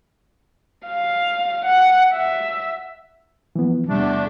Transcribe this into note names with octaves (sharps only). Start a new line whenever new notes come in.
F5
F#5
E5
E3 F3 B3
E2 C3 G3 A3 D4